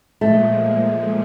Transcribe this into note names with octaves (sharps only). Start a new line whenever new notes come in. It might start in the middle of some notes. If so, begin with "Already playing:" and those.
A#2 F3 G#3 A3